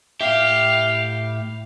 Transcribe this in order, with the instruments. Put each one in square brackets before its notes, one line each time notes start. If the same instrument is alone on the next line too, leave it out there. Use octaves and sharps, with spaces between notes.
[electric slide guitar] A2 E5 [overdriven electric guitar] G4 [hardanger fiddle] F5